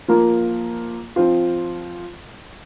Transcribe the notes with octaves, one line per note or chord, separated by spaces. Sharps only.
F3 A#3 F4 A#4
F3 C4 F4